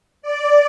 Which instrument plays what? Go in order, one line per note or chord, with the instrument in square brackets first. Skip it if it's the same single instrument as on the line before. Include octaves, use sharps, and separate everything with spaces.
[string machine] D5